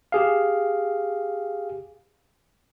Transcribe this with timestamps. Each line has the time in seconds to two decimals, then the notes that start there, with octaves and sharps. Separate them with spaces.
0.12 G4 G#4 F5